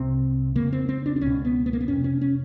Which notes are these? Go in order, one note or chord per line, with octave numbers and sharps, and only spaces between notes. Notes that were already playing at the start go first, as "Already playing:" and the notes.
Already playing: C2 C3 C4
F2 C#3 A#3
C4
C4
D4
D4
C#2 B2 C#4
B3
B3
A#3
B3
F2 C3 C#4
C#4
C#4